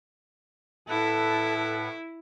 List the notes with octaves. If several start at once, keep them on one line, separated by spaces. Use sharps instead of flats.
A2 E4 A4 B4 F#5